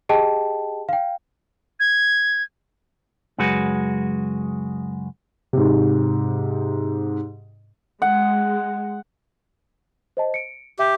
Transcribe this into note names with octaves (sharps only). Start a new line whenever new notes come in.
G4 G#4 D#5 G5 A5
F5 G5
G#6
C#2 F#2 G#3 F#4 G#4 B4
G#2 C3
G#3 F#5
C5 D#5 A5
C#7 D7
G4 E5